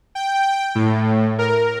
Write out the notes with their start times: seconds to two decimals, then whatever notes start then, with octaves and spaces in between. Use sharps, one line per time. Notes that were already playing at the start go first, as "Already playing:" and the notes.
0.15 G5
0.75 A2
1.38 A#4